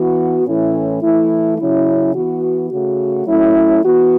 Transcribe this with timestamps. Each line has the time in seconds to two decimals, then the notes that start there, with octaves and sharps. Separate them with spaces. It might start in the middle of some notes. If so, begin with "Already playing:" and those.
Already playing: E3 B3 F#4
0.47 A2 E3 A3 C#4 E4
1.02 E3 A3 E4
1.58 C#3 F#3 C#4 E4
2.14 E3 B3 F#4
2.70 C#3 A3 F#4
3.26 F#3 A3 C#4 E4
3.82 E3 B3 F#4